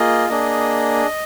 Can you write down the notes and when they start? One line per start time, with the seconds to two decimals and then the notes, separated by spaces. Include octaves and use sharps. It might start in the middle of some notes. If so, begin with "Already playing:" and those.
Already playing: A#3 F4 G#4 D#5
0.29 A#3 D4 G#4 D#5